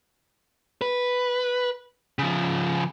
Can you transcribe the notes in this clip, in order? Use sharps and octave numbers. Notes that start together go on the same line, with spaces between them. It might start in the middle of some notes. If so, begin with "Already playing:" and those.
B4
C#3 F3